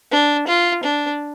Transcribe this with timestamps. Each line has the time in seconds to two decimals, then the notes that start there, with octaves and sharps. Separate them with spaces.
0.11 D4
0.47 F4
0.83 D4